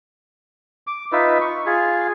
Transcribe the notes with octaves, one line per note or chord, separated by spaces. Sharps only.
D6
D#4 F4 B4 E5
C#6
F4 G#4